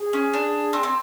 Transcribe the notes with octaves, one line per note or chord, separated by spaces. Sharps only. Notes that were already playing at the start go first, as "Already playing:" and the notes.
Already playing: G#4
C#4
D4
C4
C4